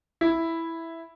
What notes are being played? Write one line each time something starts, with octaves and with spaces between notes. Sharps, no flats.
E4